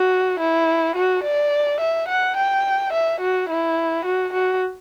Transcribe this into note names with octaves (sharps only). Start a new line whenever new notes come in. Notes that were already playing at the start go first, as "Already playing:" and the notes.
Already playing: F#4
E4
F#4
D5
E5
F#5
G5
E5
F#4
E4
F#4
F#4